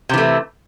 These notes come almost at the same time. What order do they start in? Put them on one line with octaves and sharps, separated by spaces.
C3 E3 A3